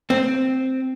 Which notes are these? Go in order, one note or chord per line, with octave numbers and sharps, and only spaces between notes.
C4